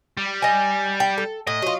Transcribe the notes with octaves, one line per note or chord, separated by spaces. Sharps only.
G3
D#5 G#5
G5
A4
A2 D#5
F#3 F4